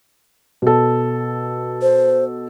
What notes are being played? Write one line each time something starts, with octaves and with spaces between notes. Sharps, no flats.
B2 A4
C5